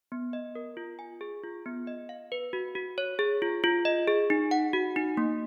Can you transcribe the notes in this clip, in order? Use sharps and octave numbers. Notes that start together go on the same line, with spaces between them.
B3
D#5
A#4
F4
G#5
G#4
F4
B3
D#5
F5
B4
F#4
F#4
C#5
G#4
F4
F4
D#5
G#4
D#4
F#5
F#4
D#4
A#3